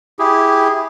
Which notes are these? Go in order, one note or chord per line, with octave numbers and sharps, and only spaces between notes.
E4 G4 G#4